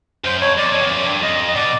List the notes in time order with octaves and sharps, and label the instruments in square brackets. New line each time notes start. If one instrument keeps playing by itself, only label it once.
[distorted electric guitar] F#2 [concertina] C5
[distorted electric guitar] F2 [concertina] C#5
[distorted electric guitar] F2 [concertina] D5
[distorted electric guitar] E2
[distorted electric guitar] F2 [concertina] C#5
[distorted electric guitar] E2 [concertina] D5
[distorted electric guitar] F#2
G2
[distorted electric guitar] F2 [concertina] D#5
[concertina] D#5
[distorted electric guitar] B2 [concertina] D5